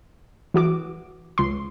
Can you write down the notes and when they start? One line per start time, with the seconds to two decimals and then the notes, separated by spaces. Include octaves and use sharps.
0.54 E3 F#4 D6
1.38 C#2 C6